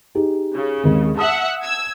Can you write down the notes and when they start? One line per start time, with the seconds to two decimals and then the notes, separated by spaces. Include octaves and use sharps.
0.15 D#4 G4 G#4
0.54 C#3
0.83 D#2 G#3 C4
1.17 E5 F#5 A5 D#6
1.63 E6 G#6